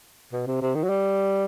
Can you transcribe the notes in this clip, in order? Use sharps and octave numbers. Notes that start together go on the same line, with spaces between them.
B2
C3
C3
D#3
F#3
G3